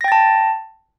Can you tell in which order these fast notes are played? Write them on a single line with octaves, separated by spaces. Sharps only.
A#6 G5 A6 A5